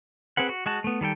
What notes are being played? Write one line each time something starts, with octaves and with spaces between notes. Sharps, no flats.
C4 G#4 B4 F#5
F#4
G#3 F#4 A5
A3 B3
D#3 G3 A4 G5